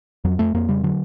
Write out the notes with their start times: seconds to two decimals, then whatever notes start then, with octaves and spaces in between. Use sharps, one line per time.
0.25 F2 F#3
0.39 F2 A3
0.54 F2 A#3
0.69 C#3 G3
0.83 D3 F#3